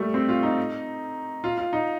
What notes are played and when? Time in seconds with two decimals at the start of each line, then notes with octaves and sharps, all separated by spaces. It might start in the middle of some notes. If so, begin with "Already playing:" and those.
Already playing: G3 A3
0.14 C4
0.29 F4
0.43 D#4
1.44 F4
1.58 F4
1.73 D#4